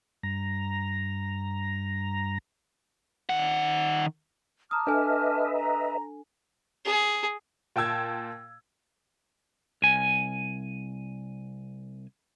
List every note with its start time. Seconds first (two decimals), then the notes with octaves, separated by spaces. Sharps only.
0.23 G2 A#5
3.29 D#3 F#5
4.71 A5 A#5 D6 D#6 F6
4.87 D4 A4 B4 D#5 E5 G#5
5.54 A#5
6.85 G#4
7.76 A#2 G5 A5 E6 G#6
9.82 C2 G#5